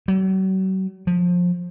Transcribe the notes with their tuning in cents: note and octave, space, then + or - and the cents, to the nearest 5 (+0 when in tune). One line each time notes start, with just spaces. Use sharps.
F#3 +40
F3 +20